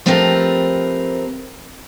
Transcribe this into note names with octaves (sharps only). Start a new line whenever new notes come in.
F3 A3 C4 G4 A#4 B4